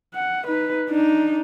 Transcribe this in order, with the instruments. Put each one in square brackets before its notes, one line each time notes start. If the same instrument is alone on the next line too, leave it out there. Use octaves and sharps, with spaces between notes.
[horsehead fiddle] F#5
D#4 B4
D4 D#4